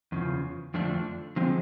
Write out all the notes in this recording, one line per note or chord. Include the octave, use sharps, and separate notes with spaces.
E2 C#3 F3
F2 D3 F3 A3 D4
D3 F3 G#3 C4